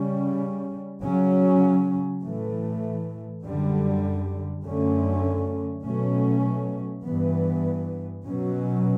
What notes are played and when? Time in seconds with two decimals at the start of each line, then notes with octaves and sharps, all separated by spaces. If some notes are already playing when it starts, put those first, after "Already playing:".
Already playing: C#3 G3 C#4
1.02 C#3 F#3 C#4
2.22 A2 E3 A3
3.44 F#2 D3 G3
4.64 F#2 D3 A3 C#4
5.85 B2 F#3 A3 C#4
7.05 G2 E3 B3
8.26 B2 F#3 C#4